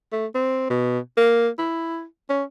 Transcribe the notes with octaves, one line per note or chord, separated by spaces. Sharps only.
A3
C4
B2
A#3
E4
C#4